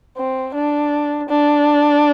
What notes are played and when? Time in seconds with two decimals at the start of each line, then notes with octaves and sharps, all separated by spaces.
0.17 C4
0.54 D4
1.29 D4